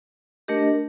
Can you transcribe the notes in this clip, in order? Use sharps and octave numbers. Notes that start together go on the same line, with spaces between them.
A3 D4 G4 A#4 D#5